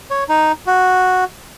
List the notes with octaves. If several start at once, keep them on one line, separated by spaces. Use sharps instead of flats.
C#5
D#4
F#4